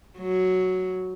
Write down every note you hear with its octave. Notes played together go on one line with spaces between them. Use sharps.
F#3